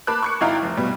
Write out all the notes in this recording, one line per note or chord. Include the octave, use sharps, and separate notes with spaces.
A#3 A5 B5 D6 F#6
C#6 F#6 C#7
G#1 D#4 E4 F5 G5 A#5
F1
B2 G3